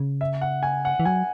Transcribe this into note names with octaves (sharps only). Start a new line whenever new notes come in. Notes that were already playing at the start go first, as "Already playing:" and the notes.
Already playing: C#3
E5
F#5
G#5
F#5
E3
F#3 G#5